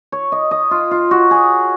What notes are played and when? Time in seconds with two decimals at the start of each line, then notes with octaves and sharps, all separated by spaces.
0.12 C#5
0.32 D#5
0.51 D#5
0.71 F4
0.91 F4
1.11 F#4
1.31 G#4